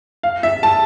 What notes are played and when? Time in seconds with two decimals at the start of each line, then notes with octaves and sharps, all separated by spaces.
0.23 F5
0.43 E5
0.63 A5